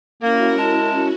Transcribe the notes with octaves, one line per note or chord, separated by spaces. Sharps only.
A#3 C#4 E4 F#4 A#4
G#3 A5